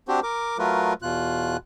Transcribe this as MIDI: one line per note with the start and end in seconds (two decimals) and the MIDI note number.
0.08 0.20 60
0.08 0.20 62
0.08 0.20 66
0.08 0.20 67
0.08 0.20 72
0.23 0.58 70
0.23 0.58 86
0.58 0.93 54
0.58 0.93 57
0.58 0.93 65
0.58 0.93 70
0.58 0.93 71
1.02 1.57 40
1.02 1.57 47
1.02 1.57 65
1.02 1.57 90